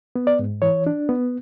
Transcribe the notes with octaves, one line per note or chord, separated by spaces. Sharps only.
B3
D5
G#2
E3 C#5
D4
B3